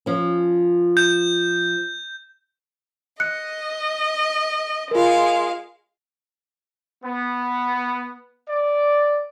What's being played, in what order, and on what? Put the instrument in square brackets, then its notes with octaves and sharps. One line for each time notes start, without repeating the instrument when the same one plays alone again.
[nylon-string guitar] F3 C#4
[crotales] G6
[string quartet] D#5 [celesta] F#6 C#7
[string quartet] G#3 F5 [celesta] F4 A#4
[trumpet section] B3
D5